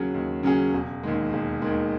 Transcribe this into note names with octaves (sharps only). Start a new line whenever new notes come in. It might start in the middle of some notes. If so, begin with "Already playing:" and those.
Already playing: D#2 C#3 F#3 C#4 G#4
D#2
C#3 F#3 C#4 G#4
E1
D#2 D#3 G#3
E1
D#2 D#3 G#3